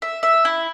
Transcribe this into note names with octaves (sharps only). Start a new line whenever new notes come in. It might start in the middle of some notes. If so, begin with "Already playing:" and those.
E5
E5
E4